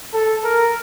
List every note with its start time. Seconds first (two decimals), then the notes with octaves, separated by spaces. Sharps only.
0.14 A4
0.44 A#4